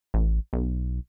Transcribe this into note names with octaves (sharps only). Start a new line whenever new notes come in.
A1
B1